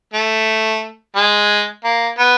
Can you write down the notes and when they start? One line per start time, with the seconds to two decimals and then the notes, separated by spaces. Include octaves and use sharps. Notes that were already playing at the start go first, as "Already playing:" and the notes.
0.14 A3
1.16 G#3
1.84 A#3
2.19 B3